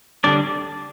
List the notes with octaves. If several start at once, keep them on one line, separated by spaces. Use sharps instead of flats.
D3 G3 D4 D5